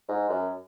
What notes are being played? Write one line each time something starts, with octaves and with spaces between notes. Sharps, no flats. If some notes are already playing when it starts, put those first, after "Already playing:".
G#2
F#2